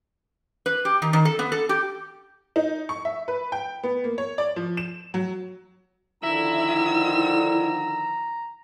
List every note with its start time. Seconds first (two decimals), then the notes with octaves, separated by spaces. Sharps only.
0.66 B4
0.85 G4
1.02 D#3
1.13 D#3
1.25 A4
1.39 B3
1.52 A4
1.69 G4
2.56 D#4
2.89 C#6
3.05 E5
3.28 B4
3.52 G5
3.83 B3
4.04 A#3
4.18 C#5
4.38 D5
4.56 F3
4.77 E7
5.14 F#3
6.23 D3 D#3 F3 E4 A#5 E6